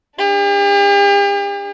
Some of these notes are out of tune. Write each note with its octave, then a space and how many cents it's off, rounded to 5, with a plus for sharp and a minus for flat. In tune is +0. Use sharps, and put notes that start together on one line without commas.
D4 +15 G4 +45